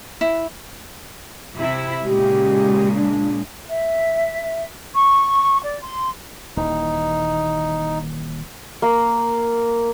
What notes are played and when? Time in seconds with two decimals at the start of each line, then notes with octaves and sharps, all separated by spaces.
0.21 E4
1.55 C3 E4
2.05 A#2 C#3 G#3 G4
2.95 D4
3.69 E5
4.94 C#6
5.63 D5
5.82 C6
6.57 D#1 D#2 E3 D#4
8.82 A#3